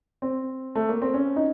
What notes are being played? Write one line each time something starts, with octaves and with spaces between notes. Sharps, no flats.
C4
A3
A#3
C4
C#4
D#4